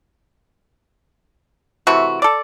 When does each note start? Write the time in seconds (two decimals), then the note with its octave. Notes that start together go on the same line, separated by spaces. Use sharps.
1.87 C3 E3 A3 F#4
2.22 A4 D5